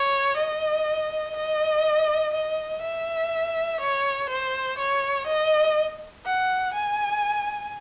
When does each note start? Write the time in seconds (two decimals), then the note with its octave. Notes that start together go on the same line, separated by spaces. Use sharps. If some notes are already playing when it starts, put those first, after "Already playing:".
Already playing: C#5
0.37 D#5
1.36 D#5
2.34 D#5
2.82 E5
3.81 C#5
4.30 C5
4.78 C#5
5.27 D#5
6.26 F#5
6.74 G#5